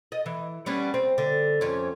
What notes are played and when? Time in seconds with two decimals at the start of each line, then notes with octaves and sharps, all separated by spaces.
0.12 D#5
0.26 E3
0.66 G3 B3 C#4
0.94 C4
1.18 D3
1.61 F2 C#4